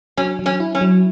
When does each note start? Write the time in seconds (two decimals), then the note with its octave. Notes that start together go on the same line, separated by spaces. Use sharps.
0.17 F#3 C#4
0.39 F#3
0.46 C#4
0.60 E4
0.75 C#4
0.81 F#3